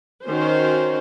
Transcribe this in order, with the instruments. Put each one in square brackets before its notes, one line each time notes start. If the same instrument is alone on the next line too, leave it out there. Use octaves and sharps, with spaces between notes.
[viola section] D#3 C#4 F#4 C5